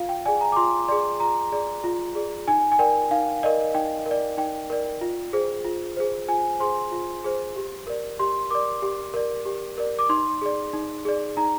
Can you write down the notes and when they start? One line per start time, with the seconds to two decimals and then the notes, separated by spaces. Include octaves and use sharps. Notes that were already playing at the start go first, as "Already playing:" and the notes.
Already playing: F4 F5
0.09 G5
0.26 G#4 D5 G#5
0.41 A#5
0.52 D6
0.56 F4 C6
0.88 G#4 D5 C6
1.20 F4 A#5
1.52 G#4 D5
1.84 F4
2.15 G#4 D5
2.48 D#4 G#5
2.72 G#5
2.79 A#4 D5 G5
3.11 D#4 F5
3.43 A#4 D5 D#5
3.74 D#4 G5
4.06 A#4
4.11 D5
4.37 D#4 G5
4.70 A#4 D5
5.01 F4
5.33 G#4 C5
5.64 F4
5.97 G#4 C5
6.28 F4 G#5
6.60 G#4 C5 C6
6.92 F4
7.24 G#4 C5
7.56 G4
7.87 A#4 D5
8.19 G4 C6
8.51 A#4 D5 D6
8.82 G4
9.14 A#4 D5
9.46 G4
9.78 A#4 D5
9.99 D6
10.09 D#4 C6
10.42 G#4 D5
10.73 D#4
11.05 G#4 D5
11.37 D#4 A#5